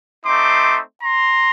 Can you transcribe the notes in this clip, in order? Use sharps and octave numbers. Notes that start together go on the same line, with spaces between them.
A3 C4 D#4 C6 D6
A#5 C6